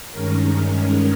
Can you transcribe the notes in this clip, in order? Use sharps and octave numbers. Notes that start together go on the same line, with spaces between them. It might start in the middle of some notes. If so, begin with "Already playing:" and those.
G2 D#3 G#3 C#4 A#4